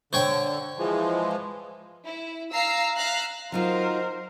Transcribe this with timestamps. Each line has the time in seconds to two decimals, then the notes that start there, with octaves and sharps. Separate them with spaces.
0.13 D3 C5 C#5 G5
0.79 E3 F3 G#3
2.05 E4
2.53 F5 A#5 E6 C7
2.96 E5 F5 A#5 F#6
3.52 F#3 D#4 F4 A#4 C5